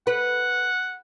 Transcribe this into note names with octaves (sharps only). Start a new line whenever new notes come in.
B4 F#5